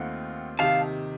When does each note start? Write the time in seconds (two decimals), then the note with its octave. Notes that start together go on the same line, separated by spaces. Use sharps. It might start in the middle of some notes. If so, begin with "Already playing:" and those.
Already playing: D#2 D#3 A3 C4 F4 F#5
0.59 C3 D#3 F5 A5